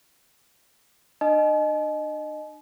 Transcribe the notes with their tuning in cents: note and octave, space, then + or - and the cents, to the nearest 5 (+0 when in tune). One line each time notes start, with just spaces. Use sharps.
D4 +40 D#5 -15 G#5 +45